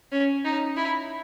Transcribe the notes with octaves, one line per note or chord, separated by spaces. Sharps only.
C#4
D#4
E4